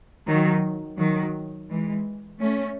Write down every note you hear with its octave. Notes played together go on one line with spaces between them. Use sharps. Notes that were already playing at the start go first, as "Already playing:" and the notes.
D#3 F#3
D#3 F#3
E3 G#3
A3 C#4